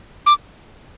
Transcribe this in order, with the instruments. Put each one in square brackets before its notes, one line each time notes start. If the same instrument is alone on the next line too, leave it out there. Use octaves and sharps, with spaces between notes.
[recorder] D6